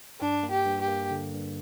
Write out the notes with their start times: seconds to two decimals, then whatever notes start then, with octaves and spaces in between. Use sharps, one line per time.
0.20 G2 D4
0.43 A#3
0.51 G4
0.65 G2
0.81 G4
0.88 A#3
1.11 D3
1.34 G2